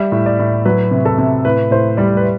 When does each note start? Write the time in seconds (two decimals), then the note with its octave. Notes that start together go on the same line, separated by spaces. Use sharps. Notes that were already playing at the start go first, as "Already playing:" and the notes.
Already playing: G3 E5
0.12 A2
0.26 D5
0.39 A2
0.65 F#3 B4
0.91 C3
1.05 A4
1.18 C3
1.45 A2 B4
1.71 A2 C5
1.97 G3 D5
2.17 B4